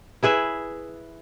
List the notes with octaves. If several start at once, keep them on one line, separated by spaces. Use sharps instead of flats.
E4 G#4 B4 E5